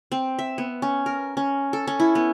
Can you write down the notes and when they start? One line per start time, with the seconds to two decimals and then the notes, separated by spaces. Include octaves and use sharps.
0.12 C4
0.39 E5
0.58 B3
0.82 C#4
1.06 A#4
1.37 C#4
1.73 A4
1.87 C#4
2.00 E4
2.15 B3